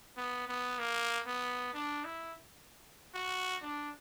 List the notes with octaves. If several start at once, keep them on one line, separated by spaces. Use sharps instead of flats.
B3
B3
A#3
B3
D4
E4
F#4
D4